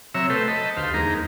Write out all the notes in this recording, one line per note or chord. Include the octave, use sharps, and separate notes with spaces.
C3 F#3 C#5 E5 A#5 E6
A3 A4 B4 C5 G5
D#5 A5 B5
D2 G4 C5 F5
E2 G#3 A#3 D#4 A#5